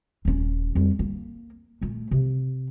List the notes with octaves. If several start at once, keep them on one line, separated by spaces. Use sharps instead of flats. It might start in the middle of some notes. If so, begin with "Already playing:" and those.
D#1 C#4
F2 G3
A#3
A#2 A3
C3